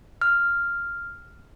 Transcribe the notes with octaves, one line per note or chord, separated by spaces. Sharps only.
F6